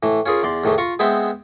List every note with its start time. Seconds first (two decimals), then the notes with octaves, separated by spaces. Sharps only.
0.03 A2 E3
0.26 C#4 F4 G#4 A#4
0.43 E2 D5 C6
0.64 E2 A2 D#3 E3
0.78 F4 A#5 C#6
0.99 G#3 B3 C4 B4 E5 G5